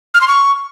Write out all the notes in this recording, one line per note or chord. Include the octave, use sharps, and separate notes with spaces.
F6
C6
C#6